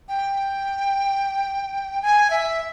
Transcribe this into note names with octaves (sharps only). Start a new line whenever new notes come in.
G5
G#5
E5